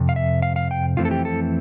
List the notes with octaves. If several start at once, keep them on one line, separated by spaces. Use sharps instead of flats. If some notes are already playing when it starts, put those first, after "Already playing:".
Already playing: F2 C3
F5
E5
F5
F5
G5
F2 E3 A3 C4 F4
A4
G4
A4